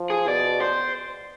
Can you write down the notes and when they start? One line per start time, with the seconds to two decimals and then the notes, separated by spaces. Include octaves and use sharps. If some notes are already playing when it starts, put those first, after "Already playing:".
Already playing: F3
0.10 G#4
0.27 B2 D5
0.61 C5